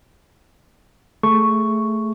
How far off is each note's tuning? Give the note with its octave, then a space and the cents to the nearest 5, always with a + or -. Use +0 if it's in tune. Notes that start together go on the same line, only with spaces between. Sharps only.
A3 +0 G#4 +5 C#6 +0